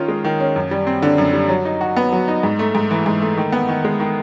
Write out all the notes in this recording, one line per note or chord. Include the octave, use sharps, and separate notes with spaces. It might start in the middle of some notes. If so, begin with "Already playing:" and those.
Already playing: D#3 C#4 F4
G#3
D#3
C#4
F#2
G3
C4
D3
F#2
G3
F#3
D#4
F#4
B3
F#3
D#4
G#2
A3
G#2
E3
G#2
A3
D#3
B3
D#3
G#3
D#3